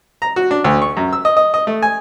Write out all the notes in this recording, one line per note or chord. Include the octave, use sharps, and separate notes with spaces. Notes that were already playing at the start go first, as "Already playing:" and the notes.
A#5
F#4
D4
D2
C#6
F#2
E6
D#5
D#5
D#5
A3
G#5